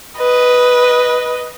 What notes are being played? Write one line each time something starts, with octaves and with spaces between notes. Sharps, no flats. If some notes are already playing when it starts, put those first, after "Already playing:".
B4 D#5